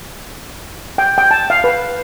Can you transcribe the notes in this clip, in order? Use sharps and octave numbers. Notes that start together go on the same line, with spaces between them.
G5
G5
A5
F5
B4